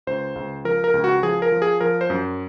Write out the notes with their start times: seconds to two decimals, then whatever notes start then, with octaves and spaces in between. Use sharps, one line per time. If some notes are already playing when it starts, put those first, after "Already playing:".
0.07 C#2 C5
0.36 C#2
0.65 F3 A#4
0.84 A#4
0.94 C#2
1.04 F#4
1.23 F3 G#4
1.42 A#4
1.52 F3
1.62 G#4
1.81 F3 A#4
2.01 C5
2.10 F#2